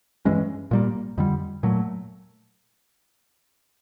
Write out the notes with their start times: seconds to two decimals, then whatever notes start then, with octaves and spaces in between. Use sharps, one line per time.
0.25 G2 E3 G#3 C#4
0.71 A#2 G3 A#3
1.18 F2 D3 G3
1.63 A#2 F#3 A3